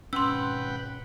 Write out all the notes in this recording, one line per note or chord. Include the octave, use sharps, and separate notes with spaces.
G#1 B2 C#4 B4 F#5 G5 C6 E6